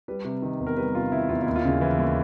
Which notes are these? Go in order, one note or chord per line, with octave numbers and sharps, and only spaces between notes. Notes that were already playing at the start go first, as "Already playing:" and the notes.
G3 B4
C3
D#3
E2
A#4
G3 B4
C3 F4
D#3 E4
E2 F4
D#2 E4
F4
C#3
E3
D#2